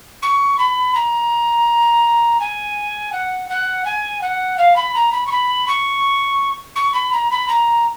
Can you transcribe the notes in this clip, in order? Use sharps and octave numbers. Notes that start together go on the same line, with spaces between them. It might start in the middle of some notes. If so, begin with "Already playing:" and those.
C#6
B5
A#5
G#5
F#5
F#5
G#5
F#5
F5
B5
A#5
B5
C#6
B5
C#6
C#6
B5
A#5
B5
A#5